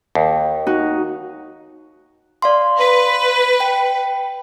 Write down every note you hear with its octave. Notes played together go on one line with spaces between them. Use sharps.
D#2
D#4 F#4
D5 F5 C6
B4
G5